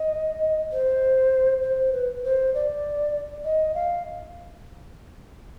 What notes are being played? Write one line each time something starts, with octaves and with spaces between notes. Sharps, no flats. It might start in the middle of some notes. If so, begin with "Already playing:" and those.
Already playing: D#5
C5
C5
B4
C5
D5
D#5
F5